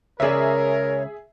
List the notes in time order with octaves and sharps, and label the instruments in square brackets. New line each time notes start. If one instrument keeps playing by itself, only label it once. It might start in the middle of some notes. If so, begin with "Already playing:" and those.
[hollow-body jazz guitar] C#2 C#3 D5 [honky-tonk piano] G#4 E5 [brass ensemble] A#4 [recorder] C#5